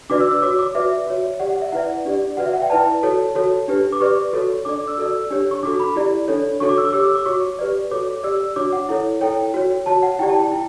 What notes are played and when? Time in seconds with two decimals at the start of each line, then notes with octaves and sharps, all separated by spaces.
0.10 D4 F#4 B4 D5 D6
0.21 E6
0.31 E6
0.42 F#4 C#5 D6
0.59 D6
0.75 F#4 B4 D5 E5
1.07 F#4 C#5
1.40 G4 D5 F#5
1.50 F#5
1.61 E5
1.72 E4 B4 D5 F#5
2.05 D4 G4 D5
2.37 F#4 B4 D5 F#5
2.46 E5
2.53 F#5
2.62 G5
2.70 E4 B4 D5 A5
3.03 F#4 A4 C#5
3.35 F#4 A4 C#5
3.68 D4 G4 B4
3.92 D6
4.00 G4 B4 D5 C#6
4.33 F#4 A4 C#5
4.65 D4 A4 D5 D6
4.88 E6
4.98 F#4 A4 D5
5.30 D4 G4 C#5
5.51 C#6
5.63 D4 F#4 A4 D6
5.80 B5
5.96 E4 G4 D5
6.28 D4 A4 C#5
6.60 D4 F#4 A4 C#5 C#6
6.69 D6
6.78 E6
6.85 D6
6.93 G4 C#5 E6
7.04 E6
7.15 D6
7.26 F#4 C#5 C#6
7.59 G4 B4 D5
7.91 F#4 A4 C#5 D6
8.24 G4 D5 E6
8.56 D4 F#4 C#5 D6
8.73 F#5
8.89 E4 A4 C#5
9.21 E4 A4 C#5 G5
9.54 F#4 C#5
9.86 F#4 C#5 A5
10.03 F#5
10.19 E4 G4 D5 G5
10.29 A5
10.39 G5
10.52 E4